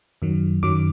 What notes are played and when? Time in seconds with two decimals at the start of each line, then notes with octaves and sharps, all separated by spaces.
0.22 F#2 D#3 F#3
0.63 F#2 D#3 F#3 D6